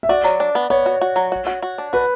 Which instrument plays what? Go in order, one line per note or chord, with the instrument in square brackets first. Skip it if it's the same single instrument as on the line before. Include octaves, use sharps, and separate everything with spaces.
[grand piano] E5
[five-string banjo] F#4 [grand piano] D5
[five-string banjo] F#3
D4
B3
[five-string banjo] B3 [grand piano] C#5
[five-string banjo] F#4
F#4
F#3
F#4
F#4
F#4
D4
[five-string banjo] F#4 [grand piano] B4